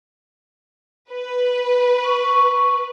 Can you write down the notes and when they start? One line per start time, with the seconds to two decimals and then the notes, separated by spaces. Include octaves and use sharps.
1.11 B4
2.04 C#6